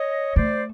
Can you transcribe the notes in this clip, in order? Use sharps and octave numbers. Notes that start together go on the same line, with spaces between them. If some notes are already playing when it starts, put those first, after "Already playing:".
Already playing: C#5 D#5
A3 C5 D5